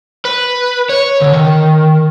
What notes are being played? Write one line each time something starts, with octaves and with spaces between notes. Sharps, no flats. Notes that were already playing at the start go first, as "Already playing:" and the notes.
B4
C#5
D3
D#3